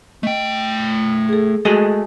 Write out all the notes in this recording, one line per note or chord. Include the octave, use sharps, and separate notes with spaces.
A3 D#5 G5
G#4 A4
G#3 A3 F#4 G#4 A4 D#5